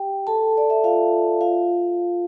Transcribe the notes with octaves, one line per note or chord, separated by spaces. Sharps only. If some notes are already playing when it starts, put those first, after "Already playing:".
Already playing: G4 G5
A4 A5
D5
E5
F4 F5
F4 F5